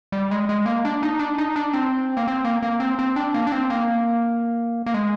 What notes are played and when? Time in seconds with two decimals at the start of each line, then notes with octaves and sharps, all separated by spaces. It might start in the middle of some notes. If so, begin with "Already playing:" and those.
0.12 G3
0.31 G#3
0.49 G#3
0.66 A#3
0.85 D4
1.03 D#4
1.19 D4
1.38 D#4
1.56 D4
1.73 C4
2.17 A#3
2.28 C4
2.45 A#3
2.63 A#3
2.80 C4
2.99 C4
3.16 D4
3.34 A#3
3.47 D4
3.52 C4
3.70 A#3
4.86 A#3
4.94 G#3